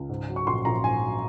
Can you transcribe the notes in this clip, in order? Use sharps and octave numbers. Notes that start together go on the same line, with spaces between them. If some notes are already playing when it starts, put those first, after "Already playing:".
Already playing: C#2
G#2
F#3
C#6
A#1 C6
A#1 A#5
G#2 G#5
F#3